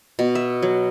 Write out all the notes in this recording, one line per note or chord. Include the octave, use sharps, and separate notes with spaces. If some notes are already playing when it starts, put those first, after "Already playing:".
B2
E5
F#3